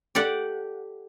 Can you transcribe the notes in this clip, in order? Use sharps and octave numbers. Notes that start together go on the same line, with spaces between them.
G4 A4 D5 F#5